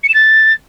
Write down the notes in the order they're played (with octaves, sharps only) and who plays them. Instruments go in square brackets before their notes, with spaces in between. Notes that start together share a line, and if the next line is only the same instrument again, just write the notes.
[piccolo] C#7
E7
A6